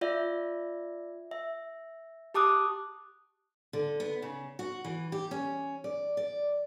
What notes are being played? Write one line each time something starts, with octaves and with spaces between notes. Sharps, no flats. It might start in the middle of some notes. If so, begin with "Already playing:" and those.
F4 D5 E5
E5
G4 A5 D6 D#6 F#6
D3
B3
C#3
F#4
E3
G4
C#4
D5
D5